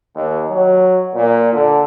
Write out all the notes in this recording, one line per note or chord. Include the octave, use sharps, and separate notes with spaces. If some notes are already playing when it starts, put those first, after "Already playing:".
D#2
F#3
A#2
D3